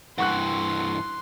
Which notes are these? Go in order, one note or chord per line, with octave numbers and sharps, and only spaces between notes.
G2 E3 F#5 C6 C#6 F#6